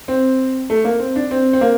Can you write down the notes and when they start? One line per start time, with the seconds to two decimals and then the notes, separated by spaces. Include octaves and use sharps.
0.08 C4
0.70 A3
0.84 A#3
1.00 C4
1.16 D4
1.31 C4
1.53 C4
1.61 A#3